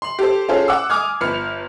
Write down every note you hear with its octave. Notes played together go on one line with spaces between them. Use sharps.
C6 F#7
G4 A4 C5
C#4 F4 G#4 A4 C5
F#5 D6 E6
G#5 D6 D#6 F6 G#6
G1 F3 B4 F6 C#7